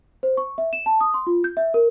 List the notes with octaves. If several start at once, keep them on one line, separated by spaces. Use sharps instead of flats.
C5
C#6
E5
E7
A5
D#6
C6
F4
G6
E5
A#4